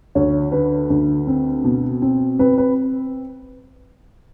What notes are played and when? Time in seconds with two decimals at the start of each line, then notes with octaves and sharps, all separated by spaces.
0.15 D2 C#5
0.52 D3 B4
0.90 D2
1.27 C4
1.64 B2
2.02 C4
2.39 C4 B4
2.58 B4